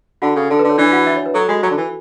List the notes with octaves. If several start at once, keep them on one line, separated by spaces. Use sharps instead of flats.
D3 F#4 F#5
C#3 A4
D3 A4
B4
D3
C#5
E3 D4 D5
F#4 F#5
E4 E5
C#5
B4
F#3 A4
G#3 F#4
F#3 F#4
D3
E3